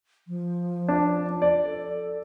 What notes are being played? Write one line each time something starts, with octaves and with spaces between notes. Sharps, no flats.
F3
D4
D5
A4